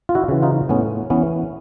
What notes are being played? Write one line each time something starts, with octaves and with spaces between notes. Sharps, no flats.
F4
E4 F#4
C#3 E3
D#4 F4
A2 B3 C#4
E3 B3 C#4